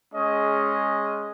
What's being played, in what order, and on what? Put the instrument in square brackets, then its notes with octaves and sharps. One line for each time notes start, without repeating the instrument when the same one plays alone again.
[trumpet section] G#3 C#4 G#4 D#5